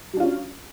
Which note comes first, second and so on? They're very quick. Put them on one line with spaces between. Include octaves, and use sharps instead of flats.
F#3 D4 F4 C#4